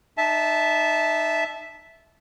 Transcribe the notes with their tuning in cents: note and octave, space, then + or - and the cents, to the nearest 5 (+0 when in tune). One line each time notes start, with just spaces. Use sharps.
D#4 -30 E5 +0 A5 -15